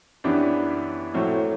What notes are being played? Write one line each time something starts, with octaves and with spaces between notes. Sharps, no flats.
F#2 E3 B3 D4 G4
A2 F#3 A3 C4